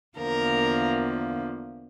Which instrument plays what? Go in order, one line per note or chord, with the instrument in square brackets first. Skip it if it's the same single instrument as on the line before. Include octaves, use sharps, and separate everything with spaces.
[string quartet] E2 D3 F3 A#3 A#4